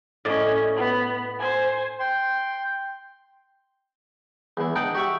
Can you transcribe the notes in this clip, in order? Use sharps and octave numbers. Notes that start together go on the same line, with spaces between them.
A2 C#4 D5 D#5
B3
C5 G#5
G5 C6
E2 E3
D4 D#4 D5 F#5 G5 A5
F#4 G4 D5 E5 C#6